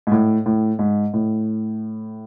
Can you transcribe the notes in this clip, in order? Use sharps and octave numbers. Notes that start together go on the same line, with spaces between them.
G#2
A2
A2
G#2
A2